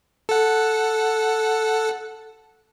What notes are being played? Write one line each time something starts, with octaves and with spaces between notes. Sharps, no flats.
A4 F#5